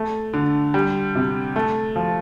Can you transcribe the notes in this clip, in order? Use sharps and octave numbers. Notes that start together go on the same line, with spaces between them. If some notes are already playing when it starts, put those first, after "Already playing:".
Already playing: A3
D3
G3
C3
A3
F3